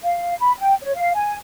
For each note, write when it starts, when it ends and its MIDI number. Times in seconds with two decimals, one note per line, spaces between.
0.03 0.34 77
0.40 0.53 83
0.59 0.75 79
0.82 0.92 73
0.96 1.11 77
1.14 1.36 80